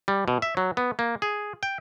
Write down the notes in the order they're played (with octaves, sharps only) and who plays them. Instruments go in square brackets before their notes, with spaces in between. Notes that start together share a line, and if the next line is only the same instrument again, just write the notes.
[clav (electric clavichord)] G3
B2
E5
F#3
B3
A#3
G#4
G5